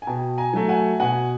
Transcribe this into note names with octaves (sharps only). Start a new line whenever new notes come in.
G#5
B2 G5 A5
G#5 A#5
F#3 A3
F#5 G#5
B2 F#5 G#5